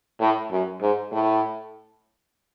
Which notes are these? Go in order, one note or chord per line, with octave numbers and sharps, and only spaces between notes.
A2
F#2
G#2
A2